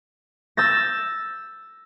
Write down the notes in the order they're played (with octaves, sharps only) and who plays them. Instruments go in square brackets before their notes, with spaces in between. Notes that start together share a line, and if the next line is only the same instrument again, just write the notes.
[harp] E6 G6 A6 A#6